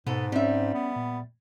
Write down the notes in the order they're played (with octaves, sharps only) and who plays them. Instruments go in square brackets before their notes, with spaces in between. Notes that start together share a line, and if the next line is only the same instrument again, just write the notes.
[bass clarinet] G#2 [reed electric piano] B2 [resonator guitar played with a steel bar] B3 A4
[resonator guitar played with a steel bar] G3 E5 [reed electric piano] C4 C#4
[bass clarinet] B3 [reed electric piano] C#4
[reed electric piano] A#2